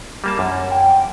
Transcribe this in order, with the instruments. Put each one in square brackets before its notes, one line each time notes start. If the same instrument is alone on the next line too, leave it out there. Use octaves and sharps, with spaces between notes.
[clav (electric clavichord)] G3 A#3 A5
F#2
[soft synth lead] G5